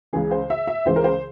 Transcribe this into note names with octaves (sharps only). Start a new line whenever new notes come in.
C#2 C#3 E3 G#4
C5
E5
E5
C#2 C#3 E3 C5
A#4
C5